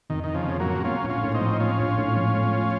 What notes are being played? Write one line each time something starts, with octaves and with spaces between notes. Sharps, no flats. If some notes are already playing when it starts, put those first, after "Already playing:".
F1 D#3
F1 D#3
C#3 F3
F2
F#3 A#3
C#3
A#3 C#4 F4
A#1
C#4 F4
A2
C4 D#4
F3
A#3 C#4 F4
A#1
A2
F3
A3